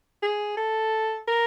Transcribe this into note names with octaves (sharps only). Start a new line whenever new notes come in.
G#4
A4
A#4